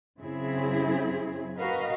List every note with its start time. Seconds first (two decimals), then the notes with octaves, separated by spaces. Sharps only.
0.19 F#2 C#3 F#3 C4 E4 G#4
1.57 F#4 A#4 B4 D#5 F5